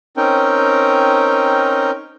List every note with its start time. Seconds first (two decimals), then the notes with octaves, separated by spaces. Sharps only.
0.17 C4 C#4 D#4 A#4 G5